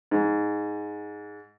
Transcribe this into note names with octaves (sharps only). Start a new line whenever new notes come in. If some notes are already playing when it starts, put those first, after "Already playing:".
G#2